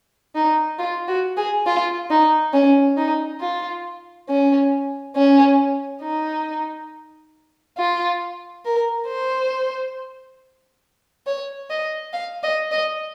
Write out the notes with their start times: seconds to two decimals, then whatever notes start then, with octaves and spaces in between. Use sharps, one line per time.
0.35 D#4
0.79 F4
1.08 F#4
1.37 G#4
1.66 F4
2.10 D#4
2.53 C#4
2.97 D#4
3.40 F4
4.29 C#4
5.16 C#4
6.03 D#4
7.78 F4
8.65 A#4
9.08 C5
11.27 C#5
11.70 D#5
12.13 F5
12.43 D#5
12.72 D#5